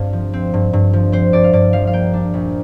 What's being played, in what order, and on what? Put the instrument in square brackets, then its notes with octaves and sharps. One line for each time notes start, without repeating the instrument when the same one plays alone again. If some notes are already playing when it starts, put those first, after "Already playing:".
Already playing: [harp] G2 C4 F5
F3
C4
G2
G2
F3
C4 C5
G2 D5
F5
G2 D5
F3 F5
F5
A#3 G5
D4
A#1